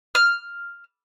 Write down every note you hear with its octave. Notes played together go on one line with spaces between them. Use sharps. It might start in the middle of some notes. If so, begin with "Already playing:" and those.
F6